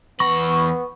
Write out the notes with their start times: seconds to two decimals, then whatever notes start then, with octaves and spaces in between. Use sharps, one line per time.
0.20 E2 B3 B5 C#6